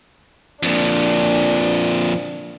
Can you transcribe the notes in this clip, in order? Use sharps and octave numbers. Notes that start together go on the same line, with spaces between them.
F2 A#2 D4